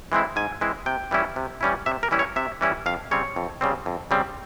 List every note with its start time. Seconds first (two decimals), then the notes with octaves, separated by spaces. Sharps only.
0.12 E3 G#3 C4 E4
0.36 G#2 G#5
0.61 E3 G#3 C4 E4
0.86 C3 G5
1.11 E3 G3 C#4 E4
1.36 C3
1.61 E3 G3 C#4 E4
1.86 C3 E5
2.03 A#4
2.11 E3 G3 C#4 E4
2.19 C#5
2.36 C3 E5
2.61 E3 G3 C#4 E4
2.86 F2 F5
3.11 C#3 G3 C4 C#5
3.36 F2
3.61 C#3 G3 C4
3.86 F2
4.11 C#3 G3 C4